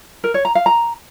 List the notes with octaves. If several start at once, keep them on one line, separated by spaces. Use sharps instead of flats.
A#4
C#5
A#5
F5
A#5